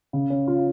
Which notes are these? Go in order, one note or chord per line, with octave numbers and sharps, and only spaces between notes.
C#3
C#4
F4